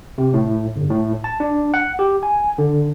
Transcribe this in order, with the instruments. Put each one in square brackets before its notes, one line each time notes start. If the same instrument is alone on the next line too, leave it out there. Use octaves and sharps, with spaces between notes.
[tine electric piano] C3
A2
G1
A2
A5
D4
F#5
G4
G#5
D3